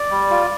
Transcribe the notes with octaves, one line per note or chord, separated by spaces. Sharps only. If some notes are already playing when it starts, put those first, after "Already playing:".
Already playing: D5
G3
F4